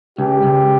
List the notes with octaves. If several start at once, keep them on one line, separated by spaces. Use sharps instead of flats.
C#2 G4
C#2